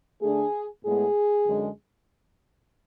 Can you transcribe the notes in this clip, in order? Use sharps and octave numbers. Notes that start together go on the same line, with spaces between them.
D3 A3 D4 G#4
A2 G#3 B3 G#4
F#2 D3 G#3